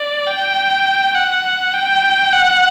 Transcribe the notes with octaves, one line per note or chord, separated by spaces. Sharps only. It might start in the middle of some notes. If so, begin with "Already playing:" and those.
Already playing: D5
G5
F#5
G5
F#5